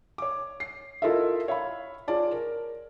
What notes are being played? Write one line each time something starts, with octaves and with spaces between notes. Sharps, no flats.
C#5 D6
C7
E4 F4 A4 A#4 D#5 E5
C#5 E5 F5 B5
F4 G#4 C#5 D5 A5
A#4